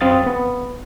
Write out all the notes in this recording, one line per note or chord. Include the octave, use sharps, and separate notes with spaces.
F#2 C4 F5 D#6 A6
B3